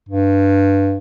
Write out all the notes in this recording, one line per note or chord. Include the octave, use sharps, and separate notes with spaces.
G2